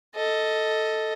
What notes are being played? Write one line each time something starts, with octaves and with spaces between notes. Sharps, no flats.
A4 D#5